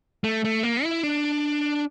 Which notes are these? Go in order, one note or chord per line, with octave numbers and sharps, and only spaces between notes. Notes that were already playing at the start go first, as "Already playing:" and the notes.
A3
A3
A#3
E4
D4